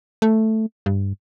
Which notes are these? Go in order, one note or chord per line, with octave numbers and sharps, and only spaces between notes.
A3
G2